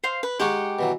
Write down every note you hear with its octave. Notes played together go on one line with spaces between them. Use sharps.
C5 F5
B4
G#3 D#4 G4 G#4 F#5 C#6
B2 E3 F#3